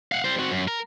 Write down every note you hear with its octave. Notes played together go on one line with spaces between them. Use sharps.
F5 F#5
G3 C5
C4 F#4
F#2
A#4